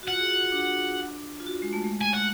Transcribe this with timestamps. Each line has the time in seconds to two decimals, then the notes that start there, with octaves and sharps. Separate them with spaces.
0.03 F#4
0.08 F4 F#5
0.20 G#4
0.31 F#4
0.41 F4
0.52 D4
1.40 F4
1.47 F#4
1.51 F4
1.62 G#3
1.73 A3
1.84 G#3
2.01 G#5
2.14 F#5